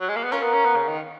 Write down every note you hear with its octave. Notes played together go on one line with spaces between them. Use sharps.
F#3
G#3
A#3
B3
A#3 C#4 F4 A#4
B3
C#4
B3
C#3
D#3